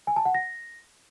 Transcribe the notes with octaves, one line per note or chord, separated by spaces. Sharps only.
G#5
A5
F#5
A#6